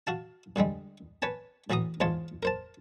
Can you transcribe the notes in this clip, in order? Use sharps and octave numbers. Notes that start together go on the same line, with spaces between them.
F#4 F5 A5
G2 D3 G3 G#3
B4 C#5 G#5 A5
A2 E3 F#4 A#5 D#6
E2 G#2 F4 C#5 A5 C6
A#4 C5 A5